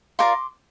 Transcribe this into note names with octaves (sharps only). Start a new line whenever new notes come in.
F4 A#4 D5 C6 D6